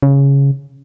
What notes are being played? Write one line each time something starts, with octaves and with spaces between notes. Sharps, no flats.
C#3